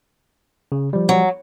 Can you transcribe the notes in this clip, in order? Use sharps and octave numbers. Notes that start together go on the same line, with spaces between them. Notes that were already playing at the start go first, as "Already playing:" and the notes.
C#3
F3 G3
F#3